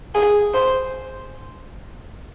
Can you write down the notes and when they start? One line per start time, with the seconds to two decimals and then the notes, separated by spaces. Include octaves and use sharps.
0.15 G#4
0.54 C5